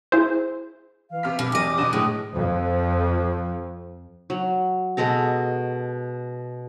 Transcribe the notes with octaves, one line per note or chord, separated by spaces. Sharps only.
E4 G#4 C5
E3 F5
C3 F6 B6
B2 G4
E2 D#5 D6
B2 D3 D#7
A2 G#4
F2 F3
F#3
B2 G#3 A4 A#5